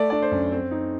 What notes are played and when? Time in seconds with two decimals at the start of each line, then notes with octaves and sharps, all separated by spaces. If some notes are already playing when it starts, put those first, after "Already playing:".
Already playing: A3 D5
0.10 D4 D5
0.22 C5
0.32 F#2
0.52 C4
0.71 D#4